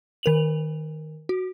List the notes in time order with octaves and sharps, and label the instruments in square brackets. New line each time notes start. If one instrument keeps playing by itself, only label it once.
[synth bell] D#3 A#4 F7 F#7
F#4